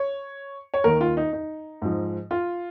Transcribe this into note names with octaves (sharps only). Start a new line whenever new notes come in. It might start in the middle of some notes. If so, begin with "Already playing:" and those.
Already playing: C#5
C#5
D#2 D#3 A#4
F4
D#4
D#4
G#2 F3
F4